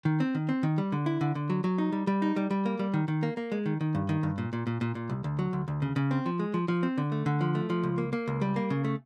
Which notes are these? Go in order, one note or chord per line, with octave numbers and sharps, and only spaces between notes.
D#3
C4
D#3
C4
D#3
G3
D3
E4
D3
D3
F#3
F#3
D#4
G3
G3
D#4
G3
G3
A#3
G3
D#3
D#3
A#3
A#3
G#3
D#3
D#3
G2
D#3
G2
A#2
A#2
A#2
A#2
A#2
C2
D2
F#3
D2
D2
C#3
C#3
C4
F3
G#3
F3
F3
C4
D3
A3
D3
F3
A3
F3
C#2
A#3
A#3
C#2
G3
A#3
C#3
A3